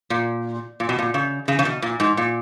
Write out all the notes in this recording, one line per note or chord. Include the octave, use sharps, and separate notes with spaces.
A#2
A#2
B2
A#2
C#3
C#3
C#3
B2
A#2
G#2
A#2